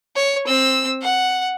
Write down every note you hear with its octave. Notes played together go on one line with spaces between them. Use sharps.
C#5
C4 E6
F#5